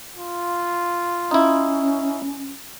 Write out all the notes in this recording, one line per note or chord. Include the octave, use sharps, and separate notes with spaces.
F4
C#4 D#4 E4